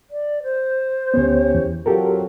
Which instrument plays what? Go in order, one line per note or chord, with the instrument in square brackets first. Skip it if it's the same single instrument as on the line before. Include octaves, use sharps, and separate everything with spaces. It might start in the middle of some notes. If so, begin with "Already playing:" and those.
[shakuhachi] D5
C5
[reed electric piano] D2 B3 [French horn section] C#4 G4 C#5
[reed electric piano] E2
[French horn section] F#3 C4 F4 [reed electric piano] G4 A4 A#4